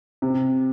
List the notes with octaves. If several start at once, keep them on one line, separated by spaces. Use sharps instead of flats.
C3